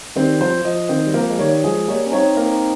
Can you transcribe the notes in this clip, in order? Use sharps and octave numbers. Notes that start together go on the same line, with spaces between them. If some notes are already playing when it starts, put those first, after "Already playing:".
D#3 G3 C4
F3 C5
F3 D#5
D#3 C4
G3
F3 A#3
G#3
D#3 G3 C#5
F3 G#3 G#4
G3 A#3 C#5
C#4
C4 D#4 C#5
A#3